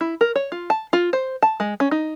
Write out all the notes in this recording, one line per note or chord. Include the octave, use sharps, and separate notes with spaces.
E4
A#4
C#5
F4
A5
F4
C5
A5
G#3
C#4
D#4